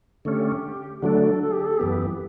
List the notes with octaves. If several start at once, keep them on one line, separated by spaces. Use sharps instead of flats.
D3 A3 C#4 G4
D3 F#3 A3 D4 A4
A4
G4
A4
F#2 E3 B3 G4